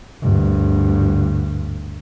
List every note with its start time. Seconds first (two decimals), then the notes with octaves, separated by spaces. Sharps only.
0.22 D2 G2